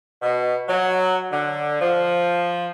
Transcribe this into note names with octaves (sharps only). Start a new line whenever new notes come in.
B2
F#3
D3
F3